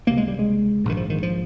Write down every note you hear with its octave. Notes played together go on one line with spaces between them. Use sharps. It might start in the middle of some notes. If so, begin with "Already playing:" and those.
C#2 C3 A#3
G#3
G3
G#3
A#1 G#2 D#3
F3
D#3
F3